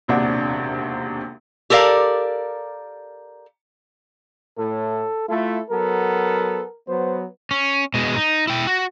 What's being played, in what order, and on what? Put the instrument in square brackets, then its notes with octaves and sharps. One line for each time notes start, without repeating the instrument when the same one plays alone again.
[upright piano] E1 A#1 D#2 C3 D4 F#5
[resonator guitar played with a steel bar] G4 A4 A#4 D5 F5
[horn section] A2 [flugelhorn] A4
[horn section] A3 E4 A4 [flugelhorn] F4
[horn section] F#3 B3 A4 [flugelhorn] A#4
[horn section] F#3 B3 [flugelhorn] C5
[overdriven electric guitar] C#4
B2 G#3
D#4
E4 G5
F#4